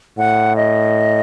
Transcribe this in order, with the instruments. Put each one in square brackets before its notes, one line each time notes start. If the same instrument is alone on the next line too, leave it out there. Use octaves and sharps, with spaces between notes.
[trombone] A2 [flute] F#5
[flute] D#5